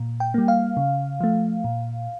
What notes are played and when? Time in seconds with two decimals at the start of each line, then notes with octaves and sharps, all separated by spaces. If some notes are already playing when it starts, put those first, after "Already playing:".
Already playing: A#2
0.20 G5
0.34 G3 A#3
0.48 F5
0.77 C#3
1.21 F3 A3
1.64 A#2